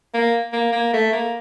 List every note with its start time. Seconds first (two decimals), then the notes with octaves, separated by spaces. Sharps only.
0.14 A#3
0.53 A#3
0.72 A#3
0.93 A3
1.12 A#3